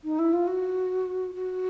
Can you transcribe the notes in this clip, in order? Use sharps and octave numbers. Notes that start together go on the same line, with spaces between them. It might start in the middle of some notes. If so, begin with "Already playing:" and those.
D#4
E4
F4
F#4
F#4